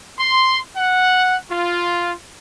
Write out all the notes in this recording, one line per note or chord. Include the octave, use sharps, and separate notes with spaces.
C6
F#5
F4